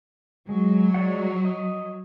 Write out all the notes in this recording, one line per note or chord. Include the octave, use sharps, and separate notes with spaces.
F#3 G#3
G#3 D5 F#5
D#5